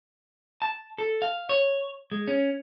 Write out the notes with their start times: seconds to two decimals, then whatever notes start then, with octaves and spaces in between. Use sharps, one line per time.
0.62 A5
0.98 A4
1.22 F5
1.49 C#5
2.12 G#3
2.28 C#4